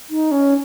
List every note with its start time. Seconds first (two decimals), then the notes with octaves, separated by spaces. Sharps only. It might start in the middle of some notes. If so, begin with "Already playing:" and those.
0.10 D#4
0.31 C#4